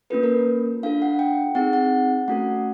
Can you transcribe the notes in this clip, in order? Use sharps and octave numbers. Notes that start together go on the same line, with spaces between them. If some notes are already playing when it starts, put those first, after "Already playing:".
A#3 C#4 F4 A4 B4
A#4
D4 F4 A4 F5
F#5
G5
C4 D#4 G#4 F#5
F#5
A3 C#4 F#4 A4 F#5